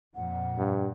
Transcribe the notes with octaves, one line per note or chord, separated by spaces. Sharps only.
F2 A#2 F#5
G2